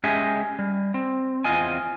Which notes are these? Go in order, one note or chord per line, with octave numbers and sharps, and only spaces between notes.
G#3 C#4 G4 G#4 D#5 E5
G3
C4
E2 C4 F4 D#5 G#5